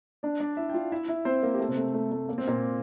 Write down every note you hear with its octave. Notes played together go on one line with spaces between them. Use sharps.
D4 D5
D4 D5
E4 E5
G5
F4 F5
E4 E5
E4 E5
C4 C5
A#3 A#4
G4
A3 A4
C3 C4
A3
A3
A3
A#3
C4
A#2 A#3